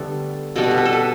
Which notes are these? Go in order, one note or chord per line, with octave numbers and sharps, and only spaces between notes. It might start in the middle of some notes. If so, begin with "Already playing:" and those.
Already playing: D3 G3 A3 B3 A4
B2 G3 B3 A4
B4
A4
B4
A4
B4